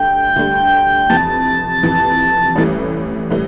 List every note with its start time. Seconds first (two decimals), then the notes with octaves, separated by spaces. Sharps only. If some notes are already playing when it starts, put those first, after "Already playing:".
Already playing: D2 D3 G3 G5
0.36 D2 D3 G3
1.10 F2 C3 E3 A5
1.83 F2 C3 E3
2.55 A1 A2 E3 G3
3.31 A2 E3 G3